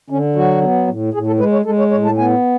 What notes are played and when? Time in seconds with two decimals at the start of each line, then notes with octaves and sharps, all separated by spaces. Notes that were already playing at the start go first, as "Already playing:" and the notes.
0.10 D3 C#4
0.35 F#3 F#4
0.62 B3
0.87 A2
1.14 A2 G#4
1.27 A4
1.39 G#3 B4
1.52 C#5
1.65 G#3 A4
1.79 C#5
1.91 A2 C#5
2.05 A5
2.18 B3 G#5